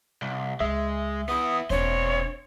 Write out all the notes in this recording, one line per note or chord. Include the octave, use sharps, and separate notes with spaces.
C2
C#2 G#3 E5
B3 E4 D#6
E1 C4 D4 C5 C#5